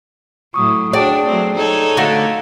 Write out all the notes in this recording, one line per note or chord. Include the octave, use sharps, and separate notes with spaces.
A2 F#3 C#6 D#6
D4 F#4 G#4 D5 G5 A5
F#3 A3 C4
D#4 A4 C#5
D3 A3 F#4 F5